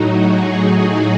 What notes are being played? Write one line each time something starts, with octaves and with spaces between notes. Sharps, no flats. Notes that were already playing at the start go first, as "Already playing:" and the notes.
Already playing: A2 F#3 D#4 F#4
G#4
F#4